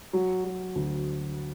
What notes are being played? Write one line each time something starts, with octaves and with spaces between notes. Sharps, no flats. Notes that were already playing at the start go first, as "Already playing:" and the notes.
F#3
F#3
D2